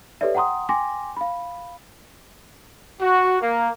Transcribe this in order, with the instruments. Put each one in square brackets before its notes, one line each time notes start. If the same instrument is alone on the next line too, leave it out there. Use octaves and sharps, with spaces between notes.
[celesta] G4 A4 B4 C#5 D5 E5
F#5 G5 A#5 C6 D#6
G5 G#5 C6 D6 A#6
F5 B5
[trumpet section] F#4
A#3